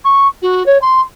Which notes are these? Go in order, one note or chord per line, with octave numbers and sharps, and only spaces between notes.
C#6
F#4
C#5
C6